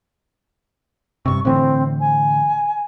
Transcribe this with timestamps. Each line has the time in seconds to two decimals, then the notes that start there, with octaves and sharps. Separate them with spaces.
1.26 G2 C3 C#6
1.45 A2 D3 E3 C4
2.00 G#5